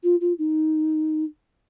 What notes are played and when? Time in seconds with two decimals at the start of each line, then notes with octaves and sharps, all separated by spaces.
0.03 F4
0.21 F4
0.38 D#4